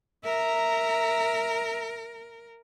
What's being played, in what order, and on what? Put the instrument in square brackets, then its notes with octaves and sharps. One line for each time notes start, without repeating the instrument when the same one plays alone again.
[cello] A#4 [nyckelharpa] E5 A#5